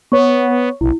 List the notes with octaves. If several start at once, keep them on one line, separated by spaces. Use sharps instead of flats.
B3 C#5 C#6
B1 E4